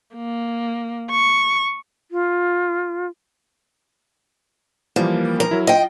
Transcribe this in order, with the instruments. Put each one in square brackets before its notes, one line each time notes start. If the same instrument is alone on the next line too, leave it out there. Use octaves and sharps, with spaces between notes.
[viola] A#3
C#6
[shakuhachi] F4
[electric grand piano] E3 F3 G3 [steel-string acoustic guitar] A#3
[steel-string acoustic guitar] A#4
[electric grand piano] F#3 E4
[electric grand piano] F4 [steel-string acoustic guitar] D#5 G5